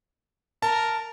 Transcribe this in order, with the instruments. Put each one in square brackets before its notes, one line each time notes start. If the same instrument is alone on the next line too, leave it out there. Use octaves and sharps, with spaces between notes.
[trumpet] A#4 [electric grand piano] A5